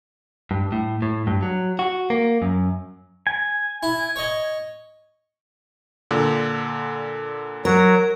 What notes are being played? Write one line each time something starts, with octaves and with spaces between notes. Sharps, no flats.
G2
A2
A2
G2
F#3
F#4
A#3
F#2
G#5
E4
C#5 D#5
A#2 D3
F#3 A#4